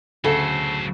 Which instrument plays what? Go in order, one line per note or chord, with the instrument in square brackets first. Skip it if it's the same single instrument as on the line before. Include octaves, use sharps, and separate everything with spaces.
[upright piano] D2 [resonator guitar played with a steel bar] C#3 [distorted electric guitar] F#3 C5 [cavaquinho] A4